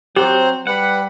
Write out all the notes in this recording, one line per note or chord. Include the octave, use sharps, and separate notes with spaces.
F#3 C4 G4 C5 F#5
G3 B4 F#5